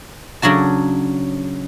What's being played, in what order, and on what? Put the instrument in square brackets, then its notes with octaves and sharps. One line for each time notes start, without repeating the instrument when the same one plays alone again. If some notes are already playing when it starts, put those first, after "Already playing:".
[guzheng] C#3 F#3 D4 F#4 A5